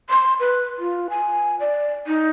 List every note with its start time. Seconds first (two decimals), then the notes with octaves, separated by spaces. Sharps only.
0.10 C6
0.40 B4
0.79 F4
1.10 G#5
1.60 D5
2.07 D#4